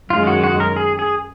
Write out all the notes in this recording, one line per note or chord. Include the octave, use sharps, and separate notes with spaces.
F#2 D#3 G#3 F4
F#4
F#4
A#4
G#4
G#4